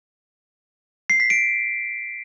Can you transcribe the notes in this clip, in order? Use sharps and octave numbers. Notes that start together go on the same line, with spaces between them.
C7
B6
D7